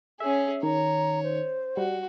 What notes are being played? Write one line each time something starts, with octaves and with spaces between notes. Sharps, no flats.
C#4 G#4 E5
D#3 C#5 A#5
C5
G3 F#4